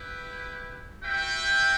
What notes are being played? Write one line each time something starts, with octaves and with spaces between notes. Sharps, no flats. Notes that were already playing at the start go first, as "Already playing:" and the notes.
Already playing: E4 G4 B4
F#4 B4 E5 G5